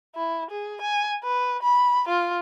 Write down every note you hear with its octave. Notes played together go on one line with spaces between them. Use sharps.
E4
G#4
G#5
B4
B5
F4